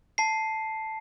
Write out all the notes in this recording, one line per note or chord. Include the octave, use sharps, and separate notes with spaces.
A5 C7